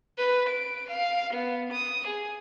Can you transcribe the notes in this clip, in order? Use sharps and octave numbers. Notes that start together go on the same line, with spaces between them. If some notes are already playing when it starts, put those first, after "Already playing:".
B4
D7
F5
B3
D#6
G#4